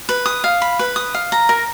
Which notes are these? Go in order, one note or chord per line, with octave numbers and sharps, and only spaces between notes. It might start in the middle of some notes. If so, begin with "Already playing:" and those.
B4
D#6
F5
B5
B4
D#6
F5
A#5
A#4